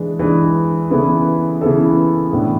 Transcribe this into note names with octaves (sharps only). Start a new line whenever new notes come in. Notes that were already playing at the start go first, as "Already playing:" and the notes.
Already playing: E3 G#3 D4
E3 G#3 D4
C#3 E3 B3 E4 A4
C#3 E3 B3 E4 A4
A2 E3 B3 D4